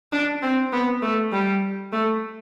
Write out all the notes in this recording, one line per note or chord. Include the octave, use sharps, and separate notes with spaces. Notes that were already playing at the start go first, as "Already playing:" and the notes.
D4
C4
B3
A3
G3
A3